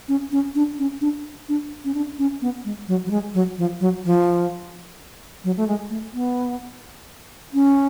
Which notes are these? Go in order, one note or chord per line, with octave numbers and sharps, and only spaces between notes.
C#4
C#4
D4
C#4
D4
D4
C#4
D4
C#4
B3
G#3
F#3
F#3
G#3
F#3
F3
F#3
F3
F#3
A3
G#3
A3
B3
C#4